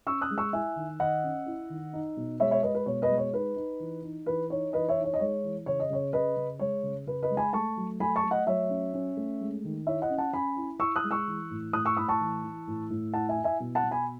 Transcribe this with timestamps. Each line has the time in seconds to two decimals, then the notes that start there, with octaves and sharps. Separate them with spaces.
0.07 C#4 C#6 E6
0.21 D#6 F#6
0.30 G#3
0.38 C#6 E6
0.53 E4 E5 G#5
0.76 D#3
1.00 D#3 D#5 F#5
1.24 C#4
1.46 E4
1.70 D#3
1.93 D#4
2.17 B2
2.40 G#3 C#5 E5
2.51 C#5 E5
2.63 G#3 B4 D#5
2.75 B4
2.86 B2 C#5
3.02 B4 D#5
3.10 G#3
3.18 C#5
3.33 D#4 B4
3.56 D#4
3.80 E3
4.03 D#4
4.26 E3 B4
4.50 D#4 C#5
4.73 E3 B4 D#5
4.89 C#5 E5
4.96 D#4
5.04 C#5
5.14 D#5
5.19 G#3 C#5
5.44 E3
5.66 C#3 C#5
5.80 D#5
5.90 C#3 C#5
6.13 C#3 B4 D#5
6.36 C#3
6.59 G#3 C#5
6.83 C#3
7.06 C#3 B4
7.22 B4 D#5
7.30 G#3
7.37 G#5 B5
7.53 A3 A5 C#6
7.77 F#3
8.00 A3 G#5 B5
8.16 A5 C#6
8.23 A3
8.31 D#5 F#5
8.47 F#3 C#5 E5
8.70 C#4
8.94 C#4
9.17 A3
9.41 G#3
9.64 D#3
9.86 E4 C#5 E5
10.02 D#5 F#5
10.10 C#4
10.18 F#5 A5
10.33 C#4 G#5 B5
10.56 E4
10.80 E4 C#6 E6
10.96 D#6 F#6
11.04 G#3
11.11 C#6 E6
11.27 E3
11.50 A2
11.73 A2 D#6 F#6
11.85 C#6 E6
11.97 A2 B5 D#6
12.08 A5 C#6
12.20 E3
12.43 E3
12.67 A2
12.90 A2
13.13 E4 F#5 A5
13.29 E5 G#5
13.37 E4
13.44 E5 G#5
13.60 B2
13.75 F#5 A5
13.83 B2
13.91 G#5 B5